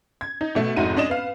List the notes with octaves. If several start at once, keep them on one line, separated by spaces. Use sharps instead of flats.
G#6
D#4
B2 A3
F1 G#2 D#4 E4 F#4 D#7
C#4 D4 D#5 E7
B3 F5